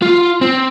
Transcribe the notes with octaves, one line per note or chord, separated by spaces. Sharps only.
F4
C4